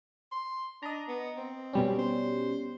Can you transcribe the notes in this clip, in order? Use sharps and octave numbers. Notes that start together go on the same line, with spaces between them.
C6
D4 D#5 A#5
B3
C4
B2 G3 C#4
C5